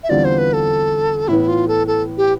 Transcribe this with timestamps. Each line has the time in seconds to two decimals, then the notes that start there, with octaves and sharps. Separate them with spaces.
0.03 E5
0.09 E2 D3 G3 C4 F4 D5
0.25 C5
0.38 B4
0.53 A4
1.28 A2 E3 B3 E4
1.48 F4
1.68 A4
1.87 A4
2.18 G4